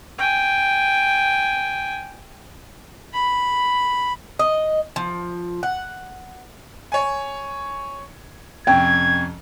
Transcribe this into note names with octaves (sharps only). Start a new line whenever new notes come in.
G5 G#5
B5
D#5
F3
F#5
C#5 G#5
F2 C3 C#4 G5 G#6